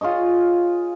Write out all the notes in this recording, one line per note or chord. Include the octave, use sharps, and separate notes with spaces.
F4 G#4 C#5 D#5